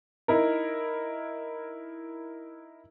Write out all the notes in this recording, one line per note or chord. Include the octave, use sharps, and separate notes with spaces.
D#4 E4 A#4